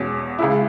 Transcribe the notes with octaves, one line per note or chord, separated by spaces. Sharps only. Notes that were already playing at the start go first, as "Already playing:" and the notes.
Already playing: E2 B2 G#3 C#4
C#2 C#3 G#3 E4